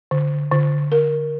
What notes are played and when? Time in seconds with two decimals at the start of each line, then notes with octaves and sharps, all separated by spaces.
0.11 D3
0.52 D3
0.92 A#4